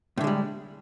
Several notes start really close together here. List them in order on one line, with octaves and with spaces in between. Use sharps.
A2 D3 G#3 G3